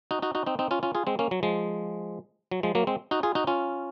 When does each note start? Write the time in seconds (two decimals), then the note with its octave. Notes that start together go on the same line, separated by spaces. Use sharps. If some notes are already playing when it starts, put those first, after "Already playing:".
0.11 D#4 F#4
0.22 D#4 F#4
0.35 D#4 F#4
0.46 C4 D#4
0.59 C4 D#4
0.71 C#4 F4
0.83 C#4 F4
0.95 F4 G#4
1.07 G#3 C4
1.19 A#3 C#4
1.31 F#3
1.43 F3 G#3
2.51 F#3
2.63 F3 G#3
2.75 F#3 A#3
2.87 G#3 C4
3.11 D#4 F#4
3.23 F4 G#4
3.35 D#4 F#4
3.47 C#4 F4